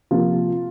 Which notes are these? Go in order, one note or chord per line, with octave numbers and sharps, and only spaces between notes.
C3 F3 A#3 F4